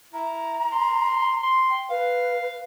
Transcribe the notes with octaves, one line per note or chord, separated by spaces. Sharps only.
E4 A#5
C6
C6
G5
B4 F5